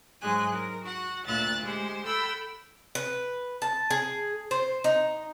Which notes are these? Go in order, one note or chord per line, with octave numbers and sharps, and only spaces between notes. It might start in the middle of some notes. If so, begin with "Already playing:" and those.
G#2 F#3 G#3 G#5 F#6
A#4
F#4 F#5
D2 A#2 E5 F#6 A6
G#3 G4 C5
A4 F#5 G5 B5 E6
B4
A5
G#4
C5
D#4